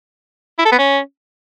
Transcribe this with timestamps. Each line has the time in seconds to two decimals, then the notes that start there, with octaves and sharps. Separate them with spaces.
0.59 E4
0.65 A4
0.72 B3
0.78 C#4